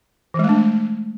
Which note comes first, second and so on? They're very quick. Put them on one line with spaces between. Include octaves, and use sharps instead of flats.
E3 G#3 A3 D4